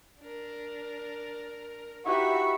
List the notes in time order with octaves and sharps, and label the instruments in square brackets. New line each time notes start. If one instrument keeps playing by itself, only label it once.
[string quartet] D4 A#4
[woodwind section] D#4 C#6 [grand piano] E4 G4 B4 [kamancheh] F#4 [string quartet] E5 B5